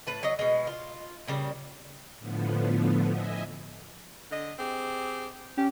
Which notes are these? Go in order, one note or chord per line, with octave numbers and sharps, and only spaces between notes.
A2 B4 A5
F#3 D#5
B2 G#3
F4
A#2 C#3 G3
A2 D3 F3 B3
D#5 E5 G#5
D3 D#5
C4 G4 G#4
C#4 G4